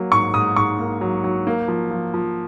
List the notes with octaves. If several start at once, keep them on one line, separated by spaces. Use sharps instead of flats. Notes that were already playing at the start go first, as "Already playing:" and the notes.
Already playing: F#3 A#3
G#2 C#6
G#2 D#6
G#2 C#6
A#3
F#3
F#3
A#3
F3
F3
F3